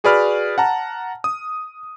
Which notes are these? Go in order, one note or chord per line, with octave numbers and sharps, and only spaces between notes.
F#4 G#4 B4 D5 B5 F6
F#5 A5 A#5
D#6